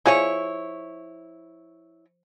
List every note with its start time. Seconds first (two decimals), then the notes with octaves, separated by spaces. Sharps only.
0.06 F3 E4 G#4 C#5